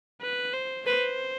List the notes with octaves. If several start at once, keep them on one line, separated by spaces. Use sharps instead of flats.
B4
C5
B4 C5